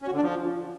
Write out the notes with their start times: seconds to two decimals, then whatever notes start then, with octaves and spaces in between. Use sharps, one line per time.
0.02 C#4
0.07 F#4
0.12 D3
0.17 D4
0.22 F3